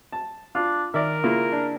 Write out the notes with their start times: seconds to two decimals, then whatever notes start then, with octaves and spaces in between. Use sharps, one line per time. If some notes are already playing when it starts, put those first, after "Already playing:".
0.12 A5
0.55 D4 F4 F5
0.94 D#3 A#4 D5 E5
1.24 C#3 A#3 E4 F4
1.53 D4